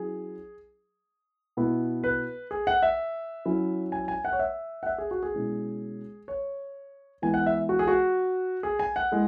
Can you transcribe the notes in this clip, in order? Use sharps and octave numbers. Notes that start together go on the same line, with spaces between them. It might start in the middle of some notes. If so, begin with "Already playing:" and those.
Already playing: F#3 C#4 E4 G#4
B2 B3 E4
B4
G#4
F#5
E5
F#3 C#4 E4
G#5
G#5
F#5
C#5
E5
F#5
E5
G#4
F#4
G#4
B2 G#3 C#4 E4
C#5
E3 G#3 B3 E4 G#5
F#5
E5
F#4
G#4
F#4
G#4
G#5
F#5
G#3 E4